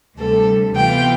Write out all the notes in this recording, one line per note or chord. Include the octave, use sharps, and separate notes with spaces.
D2 C3 G3 A4
C3 E3 B3 F4 G5